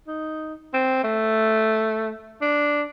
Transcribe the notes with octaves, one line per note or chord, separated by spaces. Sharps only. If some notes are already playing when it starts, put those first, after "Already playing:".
D#4
C4
A3
D4